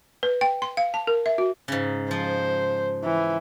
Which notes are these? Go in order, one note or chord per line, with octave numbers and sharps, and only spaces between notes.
B4
G5
C6
F5
A5
A#4
E5
F#4
G#2 C#3
F3 C5
E3